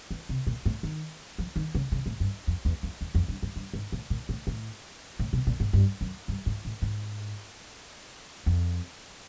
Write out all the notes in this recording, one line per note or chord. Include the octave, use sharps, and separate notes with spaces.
E3
C3
A#2
A2
D#3
F3
D#3
C#3
C#3
A2
G2
F2
E2
F2
E2
F2
G2
G#2
G2
G#2
A2
A#2
A2
A2
A2
B2
A#2
G#2
G2
F#2
G2
G#2
A2
G#2
F2